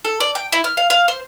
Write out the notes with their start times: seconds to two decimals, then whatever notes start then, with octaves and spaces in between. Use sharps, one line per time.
0.05 A4
0.20 D5
0.35 G5
0.52 E4
0.64 F6
0.77 F5
0.90 F5
1.08 C5